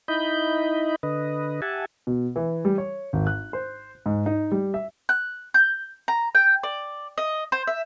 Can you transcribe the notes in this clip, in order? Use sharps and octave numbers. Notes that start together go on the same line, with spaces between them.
D#4 E4 D#5 B5 G6
D3 B4 D#5
G4 E5 F#5 G#5 A5
B2
E3
G3
C#5
G#1
F#6
C5
G#2
D#4
G3
E5
F#6
G6
A#5
G5
D5
D#5
C5
E5